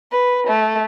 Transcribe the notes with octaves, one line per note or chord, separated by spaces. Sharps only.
B4
A3